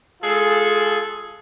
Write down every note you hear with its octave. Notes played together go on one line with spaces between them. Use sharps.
G#3 F4 G#4 A4